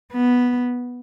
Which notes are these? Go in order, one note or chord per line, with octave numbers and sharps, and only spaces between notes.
B3